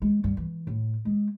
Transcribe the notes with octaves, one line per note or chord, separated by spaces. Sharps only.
G#3
G2
E3
A2
G#3